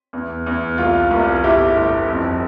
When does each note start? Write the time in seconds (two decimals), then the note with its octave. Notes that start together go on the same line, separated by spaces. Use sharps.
0.13 E2
0.46 E2
0.78 C2 F4
1.11 C2
1.44 G1 E4 G4
1.76 G1
2.08 F2